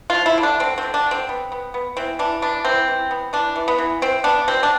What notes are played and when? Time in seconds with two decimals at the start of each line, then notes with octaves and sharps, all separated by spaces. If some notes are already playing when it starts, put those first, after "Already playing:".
0.10 F3 F4
0.26 E4
0.38 D3
0.43 D4
0.60 D3 C4
0.78 C4
0.83 D3
0.94 D4
1.06 D3 C4
1.29 B3
1.52 B3
1.74 B3
1.97 E3 C4
2.19 E3 D4
2.42 B3 D4
2.65 E3 C4
2.88 E3
3.11 B3
3.33 E3 D4
3.56 E3
3.68 B3
3.78 E3
4.02 B3 C4
4.24 B3 D4
4.48 B2 C4
4.63 D4